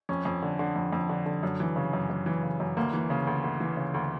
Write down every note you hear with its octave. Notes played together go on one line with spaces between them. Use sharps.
F2 C#4
F2
D3
D3
F2
F2
D3
D3
F#2
E3
C#3
F#2
F#2
E3
C#3
F#2
D2 A#3
E3
C#3
D2
D2
E3
C#3
D2